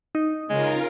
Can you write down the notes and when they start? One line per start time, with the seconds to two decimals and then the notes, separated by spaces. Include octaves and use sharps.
0.15 D#4
0.50 C#3 G#3 F4 A#4